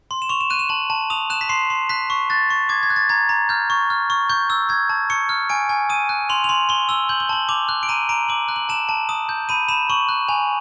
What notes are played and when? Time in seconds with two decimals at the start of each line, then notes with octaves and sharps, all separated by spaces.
0.11 C6
0.22 E7
0.29 C#6 F7
0.41 E7
0.50 F#6 D#7
0.59 E7
0.69 A5 F#7
0.90 A5
1.10 D#6 F7
1.30 F#6 E7
1.41 B6
1.49 C6 C7
1.70 C6
1.89 F#6 B6
2.10 C#6
2.30 F#6 A6
2.50 C#6
2.69 D6 G#6
2.83 G#6
2.90 F#6
2.96 A6
3.09 A#5 G#6
3.29 A#5
3.49 F6 G6
3.70 C#6
3.90 F6
4.10 C#6
4.30 C#6 G6
4.50 E6
4.69 G6 G#6
4.89 A5
5.10 C#6 C#7
5.29 F6
5.50 G#5 D7
5.69 G#5
5.89 D#6 D#7
6.09 F#6
6.29 C6 F7
6.44 F7
6.49 C6 F#7
6.69 C6 G7
6.89 E6 G7
7.09 G6 F#7
7.20 G7
7.29 A5 F#7
7.49 D6 F7
7.69 F#6
7.83 D7
7.89 A#5 D#7
8.09 A#5 D7
8.29 D6 F#7
8.49 F#6
8.56 F#7
8.69 A5 E7
8.89 A5
9.09 D#6
9.29 G6
9.49 B5 D#7
9.68 B5 E7
9.90 C#6 F#7
10.09 F#6
10.28 G#5 F7